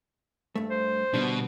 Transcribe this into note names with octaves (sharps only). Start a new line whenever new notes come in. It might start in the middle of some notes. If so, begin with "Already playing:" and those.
G2 A3
C5
D2 B2 G3 D4